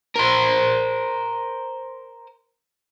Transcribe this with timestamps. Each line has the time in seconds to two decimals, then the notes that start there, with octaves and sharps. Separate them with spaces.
0.16 A#4 C5